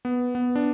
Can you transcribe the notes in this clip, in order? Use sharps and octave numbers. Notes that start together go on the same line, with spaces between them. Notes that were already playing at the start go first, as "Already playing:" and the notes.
B3
B3
D4